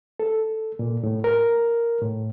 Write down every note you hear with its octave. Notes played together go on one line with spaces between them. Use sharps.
A4
A#2
A2
A#4
A2